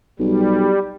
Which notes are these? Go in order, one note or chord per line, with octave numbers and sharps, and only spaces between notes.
B1 G3